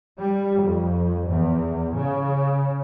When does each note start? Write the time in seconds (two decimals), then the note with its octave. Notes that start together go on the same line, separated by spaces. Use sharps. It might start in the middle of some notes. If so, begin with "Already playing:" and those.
0.19 G3
0.62 F2
1.30 E2
1.97 C#3